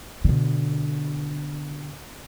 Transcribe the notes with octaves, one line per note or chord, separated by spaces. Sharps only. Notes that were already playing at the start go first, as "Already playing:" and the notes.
B2 D3